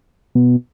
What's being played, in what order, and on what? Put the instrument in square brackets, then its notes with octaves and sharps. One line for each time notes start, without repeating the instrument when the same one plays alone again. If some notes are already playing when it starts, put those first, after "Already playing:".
[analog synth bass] B2